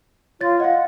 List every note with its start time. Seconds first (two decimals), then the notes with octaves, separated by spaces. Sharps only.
0.41 F4 C#5 A6
0.60 D#5 F5 F#5